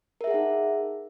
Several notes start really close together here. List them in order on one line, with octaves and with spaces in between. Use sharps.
A#4 E5 G#4 F#5 D#4